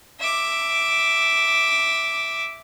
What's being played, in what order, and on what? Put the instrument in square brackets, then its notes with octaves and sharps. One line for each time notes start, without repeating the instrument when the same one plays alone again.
[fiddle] E5 D6